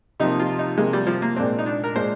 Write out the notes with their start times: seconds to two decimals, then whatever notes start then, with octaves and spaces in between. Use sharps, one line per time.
0.20 C3 F3 A#3 D#4
0.39 F4
0.59 D#4
0.78 C3 F3 G#3 A#3
0.93 G3
1.07 F3
1.22 A#3
1.36 A#2 G#3 C4 D4
1.59 D#4
1.66 D4
1.84 A#4
1.95 A#2 G#3 D4 C5